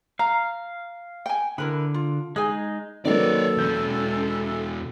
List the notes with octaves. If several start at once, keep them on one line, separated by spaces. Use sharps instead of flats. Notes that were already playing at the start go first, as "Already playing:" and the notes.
F5 A#5
G5 G#5
D3 E4 A#4 B4
F4
G#3 D#4 G#4 G#5
D#3 F#3 A#3 A4 B4 C#5 D5
E2 B2 C#4 G6